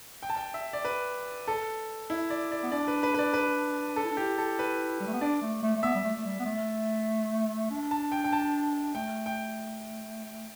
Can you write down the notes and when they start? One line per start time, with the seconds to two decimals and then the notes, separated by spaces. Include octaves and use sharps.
0.23 G5
0.30 A5
0.37 G5
0.54 E5
0.73 D5
0.85 B4
1.48 A4
2.10 E4
2.30 D5
2.52 D5
2.63 B3
2.72 D4 D5
2.88 B4
3.03 B4
3.14 B4
3.19 D5
3.34 B4
3.96 A4
4.04 E4
4.11 D4
4.17 E4 G4
4.38 A4
4.59 B4
5.00 G3
5.07 A3
5.14 B3
5.21 D4 D5
5.42 A3
5.63 A3
5.77 A3
5.83 B3 E5
5.95 G3
6.05 A3
6.18 A3
6.25 G3
6.40 B3
6.46 A3
7.71 D4
7.91 A5
8.12 G5
8.24 G5
8.33 A5
8.95 A3 G5
9.26 G5